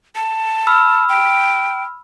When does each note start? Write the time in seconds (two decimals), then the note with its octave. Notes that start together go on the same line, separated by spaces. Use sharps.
0.15 A5
0.67 B5 E6 F6
1.09 G5